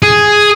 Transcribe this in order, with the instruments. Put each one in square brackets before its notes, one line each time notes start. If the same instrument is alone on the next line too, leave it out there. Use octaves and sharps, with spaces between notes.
[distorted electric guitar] G#4